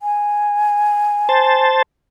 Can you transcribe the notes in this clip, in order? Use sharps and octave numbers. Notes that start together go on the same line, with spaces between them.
G#5
C5 A5